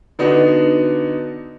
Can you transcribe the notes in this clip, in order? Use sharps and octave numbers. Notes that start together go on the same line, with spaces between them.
D3 B3 D4 D#4 F#4